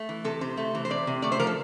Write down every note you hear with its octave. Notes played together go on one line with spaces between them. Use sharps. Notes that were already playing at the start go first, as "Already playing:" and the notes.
Already playing: A3
E3
C3 A4
C3 C5
A3
E3
C5
C3 D5
C3
A3 D5
C5
F3 A#4
A4